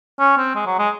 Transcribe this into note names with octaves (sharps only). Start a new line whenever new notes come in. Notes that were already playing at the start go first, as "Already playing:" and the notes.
C#4
C4
G#3
F#3
G#3